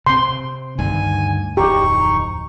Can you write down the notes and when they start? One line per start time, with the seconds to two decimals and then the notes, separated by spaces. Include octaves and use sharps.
0.06 C3 C4 C6
0.79 D2 G2 D#3 G#5
1.57 D1 F2 D#4 G4 C#6